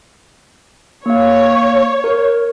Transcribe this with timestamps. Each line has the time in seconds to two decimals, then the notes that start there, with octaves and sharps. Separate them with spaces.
1.06 A#3 C#5 F5
2.04 A#4